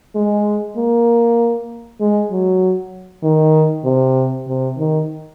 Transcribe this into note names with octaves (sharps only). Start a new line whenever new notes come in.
G#3
A#3
G#3
F#3
D#3
C3
C3
D#3